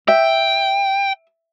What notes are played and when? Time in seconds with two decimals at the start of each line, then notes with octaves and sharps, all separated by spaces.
0.08 E5 G5